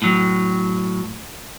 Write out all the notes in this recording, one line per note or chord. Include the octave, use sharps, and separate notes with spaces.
A2 F#3